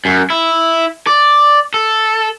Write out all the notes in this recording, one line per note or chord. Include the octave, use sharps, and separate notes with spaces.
F#2
E4
D5
A4